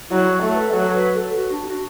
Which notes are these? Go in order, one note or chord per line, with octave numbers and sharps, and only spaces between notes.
F#3 E4
A3
B4
F#3 A4
B4
A4
F#4
D4
F#4